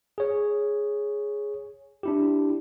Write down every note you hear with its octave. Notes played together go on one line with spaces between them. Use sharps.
G#4 C#5
D4 E4 G4